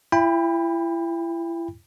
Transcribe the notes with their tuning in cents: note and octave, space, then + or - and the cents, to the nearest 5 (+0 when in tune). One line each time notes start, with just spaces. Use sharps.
E4 +30 G5 +30 B5 +0